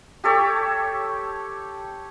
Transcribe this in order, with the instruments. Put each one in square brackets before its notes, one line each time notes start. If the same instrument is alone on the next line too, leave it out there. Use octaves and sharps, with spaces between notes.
[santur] G4 A4 C#5